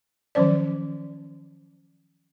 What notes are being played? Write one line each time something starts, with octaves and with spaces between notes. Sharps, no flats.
D#3 F3 F#3 C#4 C5 D5